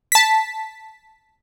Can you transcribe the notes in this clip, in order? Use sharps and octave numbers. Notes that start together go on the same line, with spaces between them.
A5 B6